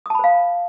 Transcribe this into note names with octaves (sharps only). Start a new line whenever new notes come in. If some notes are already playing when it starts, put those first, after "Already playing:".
C5 F5 A5 B5 D#6